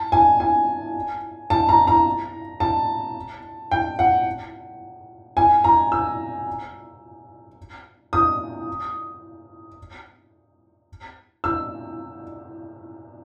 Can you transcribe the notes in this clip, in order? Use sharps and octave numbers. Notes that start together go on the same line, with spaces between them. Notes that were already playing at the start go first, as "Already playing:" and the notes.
Already playing: A5
G#5
G#5
A5
A#5
A#5
A5
G5
F#5
G#5
A#5
E6
D#6
E6